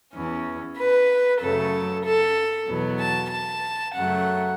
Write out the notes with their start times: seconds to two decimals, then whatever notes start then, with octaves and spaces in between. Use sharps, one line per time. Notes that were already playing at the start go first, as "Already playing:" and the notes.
0.14 E2 E3 C#4
0.77 B4
1.41 F#2 C#3 F#3 A3 A4
2.04 A4
2.67 E2 B2 F#3 B3
2.99 A5
3.30 A5
3.94 F#2 C#3 F#3 A3 F#5